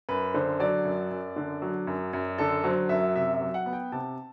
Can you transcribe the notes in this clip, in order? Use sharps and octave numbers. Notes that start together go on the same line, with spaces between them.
F#2 B4
D3 C5
F#3 D5
F#2
F#2
D3
F#3
F#2
F#2
D3 A4
F#3 C5
F#2 E5
C3 E5
E5
F#3
F#5
B3
G5
C3 A5